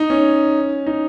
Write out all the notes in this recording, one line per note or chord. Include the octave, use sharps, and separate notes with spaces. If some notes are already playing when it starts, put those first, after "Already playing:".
Already playing: D#4
C#4
D#4